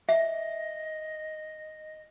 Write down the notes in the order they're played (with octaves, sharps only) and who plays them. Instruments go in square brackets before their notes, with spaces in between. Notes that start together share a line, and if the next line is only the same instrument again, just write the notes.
[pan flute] D#5 [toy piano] E5